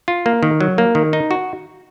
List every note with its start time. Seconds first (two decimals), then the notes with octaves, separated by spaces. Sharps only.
0.08 F4
0.26 A#3
0.43 D#3
0.61 F#3
0.78 A#3
0.95 D#3
1.13 D#4
1.31 F#4